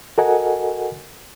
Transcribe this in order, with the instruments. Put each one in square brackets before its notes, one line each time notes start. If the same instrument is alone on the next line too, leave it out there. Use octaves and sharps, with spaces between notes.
[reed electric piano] F#4 A4 A#4 D#5 F#5 G#5